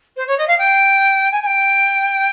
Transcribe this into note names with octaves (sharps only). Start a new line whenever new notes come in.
C5
C#5
D#5
F5
G5
G#5
G#5
G5